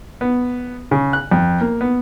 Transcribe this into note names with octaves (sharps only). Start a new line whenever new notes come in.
B3
C#3
F#6
F2
A#3
B3